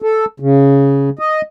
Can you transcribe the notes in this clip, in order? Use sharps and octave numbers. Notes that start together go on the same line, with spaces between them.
A4
C#3
D#5